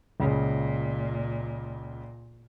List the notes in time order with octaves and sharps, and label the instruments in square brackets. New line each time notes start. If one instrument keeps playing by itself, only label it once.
[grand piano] C#2 C#3 [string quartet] A#2